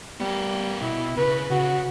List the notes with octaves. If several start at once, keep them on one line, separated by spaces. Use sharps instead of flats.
G3 B3 A#4
B2 E4
C#3 B4
C#3 F#4